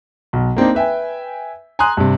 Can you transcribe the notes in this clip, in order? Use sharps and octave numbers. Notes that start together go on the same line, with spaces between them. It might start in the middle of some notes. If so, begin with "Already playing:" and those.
B1
A#3 C4 D4 D#4
B4 E5 G5 G#5
G#5 A#5 C6 D#6 F#6
G2 C3